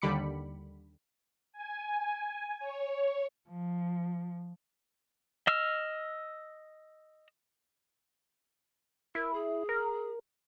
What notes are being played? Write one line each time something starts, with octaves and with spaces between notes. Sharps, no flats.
D#2 D3 G3 B5 D6 C#7
G#5
C#5
F3
D#5 E6 F6
E4 A#4
G#4
A#4